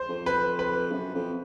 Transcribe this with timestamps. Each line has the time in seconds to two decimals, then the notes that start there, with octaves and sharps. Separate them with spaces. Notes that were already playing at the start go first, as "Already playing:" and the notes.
Already playing: C5
0.09 F2
0.26 B4
0.59 B4
0.92 F#2
1.15 F2